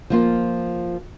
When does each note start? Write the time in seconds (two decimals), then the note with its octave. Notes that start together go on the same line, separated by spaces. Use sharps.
0.10 F3 A#3 F4